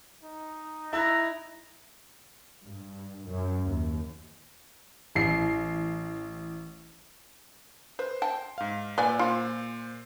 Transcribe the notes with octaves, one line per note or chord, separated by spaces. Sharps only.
D#4
E4 A#5 E6 F#6
G2
F#2
D#2
A1 C7
B4 C5
G5 A5
G#2 F5
A#2 B4 D5 G#5
A#2 F4 C5 D7